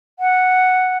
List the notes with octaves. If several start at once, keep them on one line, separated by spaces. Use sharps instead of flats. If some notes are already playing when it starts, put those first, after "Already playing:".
F#5